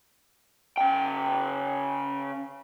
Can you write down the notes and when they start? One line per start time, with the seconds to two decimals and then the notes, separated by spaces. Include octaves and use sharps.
0.78 C#3 G5